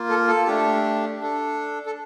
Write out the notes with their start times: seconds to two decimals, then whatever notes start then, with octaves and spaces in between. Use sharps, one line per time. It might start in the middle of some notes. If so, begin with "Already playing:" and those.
Already playing: A#3 F4
0.09 A4
0.27 A4
0.46 A3 D4 G4
1.20 D4 A4
1.86 A4